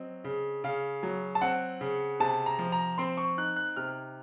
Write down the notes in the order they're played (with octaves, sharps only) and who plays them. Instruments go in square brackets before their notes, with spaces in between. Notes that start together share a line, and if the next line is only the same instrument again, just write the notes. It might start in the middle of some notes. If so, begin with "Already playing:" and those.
Already playing: [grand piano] F#3 C4 D#5
C#3
C#3 F5
F#3
A5
C4 F#5
C#3
C3 A5
A#5
F3
A#5
C4 C6
C#6
D#4 F#6
F#6
C3 F6